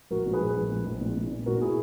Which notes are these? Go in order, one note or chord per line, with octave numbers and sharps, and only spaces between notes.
A#1 F#4 A#4
A#2
G#4 B4
A#1
A#1
A#2
A#1
A#2
A#2
A#2
A#2 F#4 A#4
A#2 E4 G#4